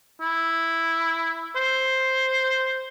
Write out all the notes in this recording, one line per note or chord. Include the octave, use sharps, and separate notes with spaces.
E4
C5